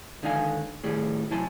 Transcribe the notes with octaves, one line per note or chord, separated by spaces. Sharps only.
C#2 D3 D#3 D#4 F5 G#5
A2 D#3 G3 G#4
C3 F#3 E4 G#5 A5 C6